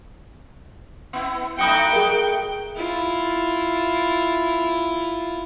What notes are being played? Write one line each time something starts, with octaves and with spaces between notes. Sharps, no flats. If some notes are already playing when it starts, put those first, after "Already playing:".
B3 E4
A3 D#4 F#4 G5 B5 D#6 C#7
G#4 A#4
E4 F4